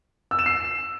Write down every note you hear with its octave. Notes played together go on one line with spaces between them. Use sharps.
E6
E7
C7